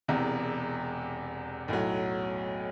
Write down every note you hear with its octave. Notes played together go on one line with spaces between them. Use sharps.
E1 E2 C3
B1 A2 F#3